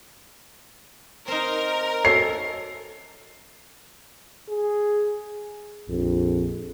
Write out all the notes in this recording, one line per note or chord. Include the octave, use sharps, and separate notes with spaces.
C4 D#4 A#4
F#2 A4 C7
G#4
A#1 F2